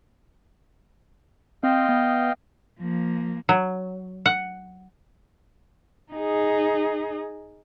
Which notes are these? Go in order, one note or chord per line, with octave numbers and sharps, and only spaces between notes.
C4 D#5 F5 G5
B3
F3 A#3
F#3
F#5
D#4 G#4